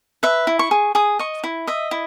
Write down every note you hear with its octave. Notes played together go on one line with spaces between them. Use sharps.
B4 E5
E4
C#6
G#4
G#4 D#6
D#5 C#6
E4
D#5 E5
E4